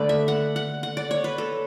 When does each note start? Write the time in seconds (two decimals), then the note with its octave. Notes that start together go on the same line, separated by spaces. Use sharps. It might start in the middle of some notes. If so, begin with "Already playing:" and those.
Already playing: D3 A3 B4 D5
0.09 E5
0.28 F#5
0.56 F#5
0.83 F#5
0.97 D5
1.11 C#5
1.24 B4
1.38 A4